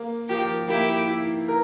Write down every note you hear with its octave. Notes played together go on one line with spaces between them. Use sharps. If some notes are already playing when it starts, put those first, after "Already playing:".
Already playing: A#3
F3 G4 A#4
A#3 E4 G4
E4
A#4